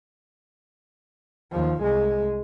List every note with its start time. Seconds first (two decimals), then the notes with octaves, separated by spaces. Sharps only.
1.51 D#2 F3
1.81 C2 G#3